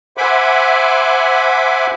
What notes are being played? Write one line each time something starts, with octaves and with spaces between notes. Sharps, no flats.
C5 E5 F#5 G#5 B5 D6